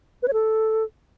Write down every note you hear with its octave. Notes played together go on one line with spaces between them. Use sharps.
B4
C#5
A4